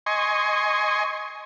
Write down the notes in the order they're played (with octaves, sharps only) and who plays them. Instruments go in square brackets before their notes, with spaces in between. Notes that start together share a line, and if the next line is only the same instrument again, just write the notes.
[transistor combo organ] D#5 G#5 C6 C#6